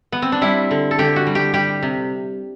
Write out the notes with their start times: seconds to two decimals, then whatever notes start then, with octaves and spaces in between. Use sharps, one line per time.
0.12 B3
0.22 C4
0.32 D4
0.41 G3 E4
0.71 D3
0.91 A4
0.99 D3 G4
1.16 F#4
1.27 G3
1.35 G4
1.54 G3 G4
1.82 C3